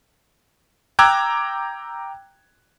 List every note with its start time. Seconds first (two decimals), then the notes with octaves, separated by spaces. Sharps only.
0.99 G5 A#5 D6 E6 F#6 G#6